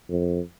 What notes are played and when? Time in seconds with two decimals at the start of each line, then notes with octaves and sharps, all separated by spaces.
0.09 F2